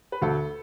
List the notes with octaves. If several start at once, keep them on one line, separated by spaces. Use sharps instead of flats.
B4
D2 A4